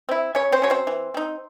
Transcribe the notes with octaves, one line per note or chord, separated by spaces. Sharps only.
C4 E4
C#3 C#4 C#5
C4 C5
F#3 C#4 C#5
C4 C5
E3
C4 D#4